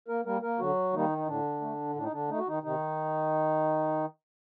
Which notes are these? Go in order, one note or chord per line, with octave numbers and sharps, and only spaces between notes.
A#3 A#4
G3 A#3 A#4
A#3 A#4
D3 F#3 F#4
D#3 G3 A#3 D#4
D#4
A2 D3 D4
A3
A2 D4
D#4
D3 D4
A3 D#4
F#4
D#3 D#4
C3 D#3 D#4